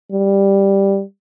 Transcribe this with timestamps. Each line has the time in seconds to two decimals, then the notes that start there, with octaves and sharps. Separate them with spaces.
0.12 G3